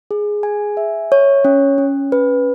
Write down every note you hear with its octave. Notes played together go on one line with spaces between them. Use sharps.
G#4
G#5
E5
C#5
C#4
C#4
B4